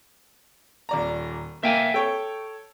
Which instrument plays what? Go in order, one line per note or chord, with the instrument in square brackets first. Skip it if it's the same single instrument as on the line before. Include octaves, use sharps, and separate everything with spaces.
[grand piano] D#1 D5 A#5
[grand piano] A#3 [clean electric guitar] E5 G5 G#5
[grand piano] A4 C#5 [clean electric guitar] G5